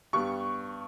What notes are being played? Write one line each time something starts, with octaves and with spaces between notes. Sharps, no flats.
G2 G3 B3 C#6